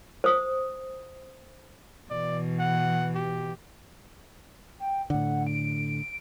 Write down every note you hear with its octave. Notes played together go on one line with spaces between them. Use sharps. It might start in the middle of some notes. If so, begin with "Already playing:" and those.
C5 D#6
B2 E3 D5
F#5
G4
G5
A2 D3 F#5
D7